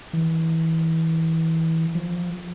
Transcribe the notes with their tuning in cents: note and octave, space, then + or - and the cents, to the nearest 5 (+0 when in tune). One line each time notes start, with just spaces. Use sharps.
E3 -25
F3 +5